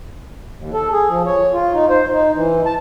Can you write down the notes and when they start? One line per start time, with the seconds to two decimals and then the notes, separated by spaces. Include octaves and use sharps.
0.58 D#2
0.74 A4
0.92 G#4
1.09 F3
1.26 C#5
1.53 F4
1.74 D#4
1.89 C5
2.12 D#4
2.34 E3
2.66 A5